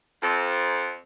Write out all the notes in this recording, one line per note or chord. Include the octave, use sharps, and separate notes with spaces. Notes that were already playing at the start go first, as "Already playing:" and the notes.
F2